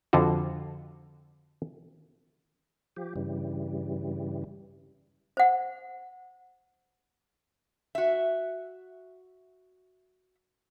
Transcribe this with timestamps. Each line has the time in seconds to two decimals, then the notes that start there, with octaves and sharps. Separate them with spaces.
0.13 F2 D3 F4 F#4
2.97 F3 G4
3.16 G2 C#3 E3 G3
5.37 C5 F#5
7.95 F#4 E5